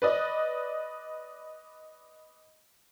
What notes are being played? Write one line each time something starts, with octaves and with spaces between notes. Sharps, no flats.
B4 D5 D#5